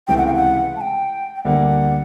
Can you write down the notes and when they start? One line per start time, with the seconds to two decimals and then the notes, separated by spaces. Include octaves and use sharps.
0.08 C#2 C3 E3 A3 G5
0.17 F#5
0.26 F5
0.34 F#5
0.76 A5
0.81 G5
1.35 G5
1.45 D2 D3 G3 A#3 F#5